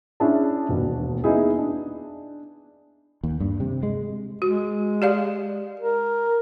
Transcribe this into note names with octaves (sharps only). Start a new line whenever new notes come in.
C#4 D4 E4 G#4 E5 A5
E1 D#2 B2
B3 D#4 E4 G#4
D4
D#2
G2
C3
G#3
G#3 F#4
G4 D5 F5
A#4